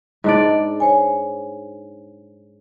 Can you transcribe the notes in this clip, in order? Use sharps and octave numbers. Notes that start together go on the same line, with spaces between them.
G#2 D4 D5
C5 C#5 G#5